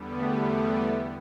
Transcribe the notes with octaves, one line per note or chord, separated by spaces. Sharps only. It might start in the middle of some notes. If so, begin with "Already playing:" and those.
Already playing: E2 D3 G3 B3
A3